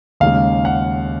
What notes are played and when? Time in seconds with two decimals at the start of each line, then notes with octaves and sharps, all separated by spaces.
0.20 D#2 C#3 G#3 F5
0.65 F#5